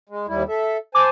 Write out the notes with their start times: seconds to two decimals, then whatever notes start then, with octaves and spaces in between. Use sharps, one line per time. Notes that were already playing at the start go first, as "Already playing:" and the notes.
0.09 G#3
0.28 D#2 G3 E4
0.49 A4 E5
0.95 C5 G#5 A5 D6